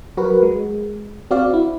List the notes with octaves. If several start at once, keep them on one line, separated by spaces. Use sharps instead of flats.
F#3 F#4 A#4 B4
G#3
C4 F#4 D5 F5
E4